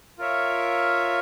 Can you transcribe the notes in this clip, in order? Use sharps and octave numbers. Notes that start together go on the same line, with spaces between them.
F4 A#4 C#5 E5